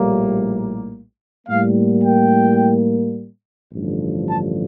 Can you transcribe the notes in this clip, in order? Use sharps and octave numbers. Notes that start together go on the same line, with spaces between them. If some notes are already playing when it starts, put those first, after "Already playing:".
Already playing: A#1 A2 G3 A#3
A2 G3 A#3 F5
G5
A1 G2 D3 F3
A5